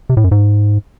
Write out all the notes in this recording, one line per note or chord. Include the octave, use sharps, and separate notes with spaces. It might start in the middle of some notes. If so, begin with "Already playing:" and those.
C3
A2
F#2
G#2